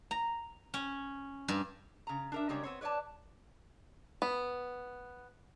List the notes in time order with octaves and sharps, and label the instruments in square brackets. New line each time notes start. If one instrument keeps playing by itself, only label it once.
[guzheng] A#5
C#4
G2
[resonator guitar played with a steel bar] C#3 A#5
D4 A#4 E5
C#3 G3 G#3 D4 A#4 C#5
B3 C4 C#5
B4 C#5 D5 E5 A5
[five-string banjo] B3